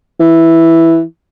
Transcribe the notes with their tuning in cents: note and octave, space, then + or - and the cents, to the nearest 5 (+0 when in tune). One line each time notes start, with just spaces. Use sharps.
E3 +0